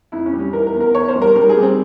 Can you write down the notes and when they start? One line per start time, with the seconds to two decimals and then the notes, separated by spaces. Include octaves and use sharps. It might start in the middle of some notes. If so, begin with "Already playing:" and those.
0.12 F2 E4
0.26 C#4
0.33 G3
0.39 C#4
0.53 E3 A#4
0.67 A#4
0.74 E2
0.80 A#4
0.95 E2 C#5
1.08 C5
1.16 G3
1.22 A#4
1.36 G3 A#4
1.49 G#4
1.57 G3
1.63 C4